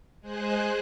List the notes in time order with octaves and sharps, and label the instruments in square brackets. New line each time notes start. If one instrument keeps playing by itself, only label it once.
[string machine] G#3 G#4 C5 F#6